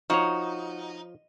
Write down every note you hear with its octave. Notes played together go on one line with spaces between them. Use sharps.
F3 D#4 F#4 C#5